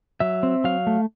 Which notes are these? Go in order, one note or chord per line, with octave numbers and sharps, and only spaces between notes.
F#3 E5
C4
F#3 F5
A3